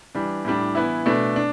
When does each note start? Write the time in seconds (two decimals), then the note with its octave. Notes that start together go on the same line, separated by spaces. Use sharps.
0.15 E3 G3 D4
0.45 A2 G3 D4
0.75 E3 B3 E4
1.06 B2 A3 D4
1.36 D4